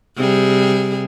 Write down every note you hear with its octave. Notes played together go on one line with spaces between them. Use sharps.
C3 G3 G#4